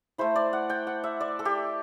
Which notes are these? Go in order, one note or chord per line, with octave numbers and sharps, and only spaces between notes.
A3 E4 C5
D5
F#5
G5
F#5
E5
D5
A4
G4